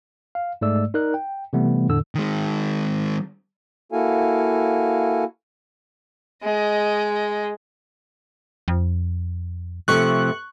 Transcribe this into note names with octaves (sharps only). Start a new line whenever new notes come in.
F5
G#2 G#3 A3 D5 E6
D#4 A#4 D5 F#6
G5
C3 E3 G3 A3 B3
E2 A2 D3 E6
D#3 G#3
A#3 E4 F#4 A4 F5 G#5
G#3 D#5
F2
C3 F3 A3 C#6 F#6